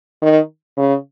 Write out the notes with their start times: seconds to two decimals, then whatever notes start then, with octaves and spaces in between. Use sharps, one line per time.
0.22 D#3
0.77 C#3